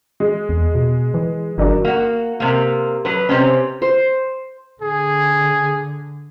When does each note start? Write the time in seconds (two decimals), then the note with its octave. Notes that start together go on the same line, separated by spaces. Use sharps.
0.20 G#3
0.49 E2
0.75 B2
1.14 E3
1.58 G1 D#3 F#3 D4
1.85 A#3 F#4
2.40 C3 A#3
3.05 F#3 B4
3.29 C3 C4 C#4
3.82 C5
4.82 D3 G#4